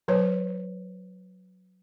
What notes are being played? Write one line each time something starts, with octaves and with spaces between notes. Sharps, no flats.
F#3 B4 C#5